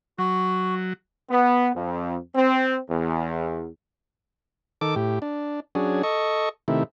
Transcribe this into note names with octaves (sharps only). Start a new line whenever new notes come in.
F#3 F#4
B3
F2
C4
E2
D#3 A4 D6
A2 G4
D4
F#3 C#4 D4 G#4
A4 D#5 C#6
C3 D#3 A3 E4